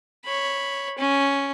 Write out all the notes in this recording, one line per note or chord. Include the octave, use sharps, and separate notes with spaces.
C#5 B5
C#4